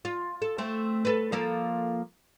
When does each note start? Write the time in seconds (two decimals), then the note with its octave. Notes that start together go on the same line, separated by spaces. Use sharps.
0.05 F4
0.42 A4
0.58 A3 C4
1.05 A4 B4
1.32 F3 A#3 A4